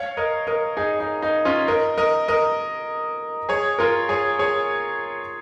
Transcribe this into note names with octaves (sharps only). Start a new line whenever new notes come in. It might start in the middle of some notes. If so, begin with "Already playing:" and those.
Already playing: C#5 F5
A#4 D#5
A#4 D#5
D#4 G#4
D#4
D#4
C#4 F4
A#4 D#5
A#4 D#5
A#4 D#5
G#4 C#5
F4 A#4
G#4 C#5
G#4 C#5